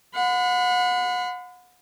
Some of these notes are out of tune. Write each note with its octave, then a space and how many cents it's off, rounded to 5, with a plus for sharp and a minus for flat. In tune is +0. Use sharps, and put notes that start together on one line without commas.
F#5 -35 B5 +35